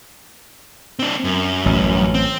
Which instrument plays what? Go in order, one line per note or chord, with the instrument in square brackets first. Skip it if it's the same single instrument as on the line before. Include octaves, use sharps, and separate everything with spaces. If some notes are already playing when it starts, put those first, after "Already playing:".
[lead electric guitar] C4 D4
F#2
[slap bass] A1
[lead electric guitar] C4